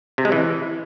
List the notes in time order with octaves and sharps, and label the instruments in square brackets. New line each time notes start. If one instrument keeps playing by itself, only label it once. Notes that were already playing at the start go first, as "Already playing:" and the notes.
[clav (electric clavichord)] C3
G#3
E3